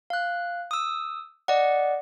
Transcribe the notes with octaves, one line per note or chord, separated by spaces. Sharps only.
F5 F#6
D#6 E6
D5 D#5 F#5